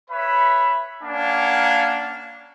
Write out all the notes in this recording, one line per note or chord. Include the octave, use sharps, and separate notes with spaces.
B4 C#5 E5 B5
A#3 C#4 D4 F5 F#5 G#5